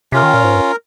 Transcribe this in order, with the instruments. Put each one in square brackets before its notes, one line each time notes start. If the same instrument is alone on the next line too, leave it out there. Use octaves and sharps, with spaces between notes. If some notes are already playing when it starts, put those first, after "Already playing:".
[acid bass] C3 [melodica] C#4 F4 A#4
[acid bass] D#3
A#2
G#2
G2